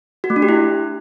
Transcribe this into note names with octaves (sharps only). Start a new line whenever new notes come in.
F#4
A3
D4
G4
E4